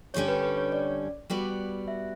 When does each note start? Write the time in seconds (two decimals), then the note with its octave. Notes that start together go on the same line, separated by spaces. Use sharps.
0.14 G2 D3 G3 C#4 G4 C#5
0.28 B4
0.43 B4
0.57 C#5
0.72 D5
1.30 G3 B3 F#4 B4 D5
1.88 E5